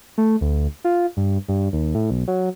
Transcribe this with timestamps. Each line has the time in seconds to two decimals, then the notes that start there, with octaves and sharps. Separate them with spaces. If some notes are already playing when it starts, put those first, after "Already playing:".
0.18 A3
0.41 D2
0.85 F4
1.17 G2
1.48 G2
1.73 D#2
1.95 A2
2.11 B1
2.28 F#3